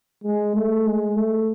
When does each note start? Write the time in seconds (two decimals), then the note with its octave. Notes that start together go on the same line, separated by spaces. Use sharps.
0.24 G#3
0.55 A3
0.87 G#3
1.16 A3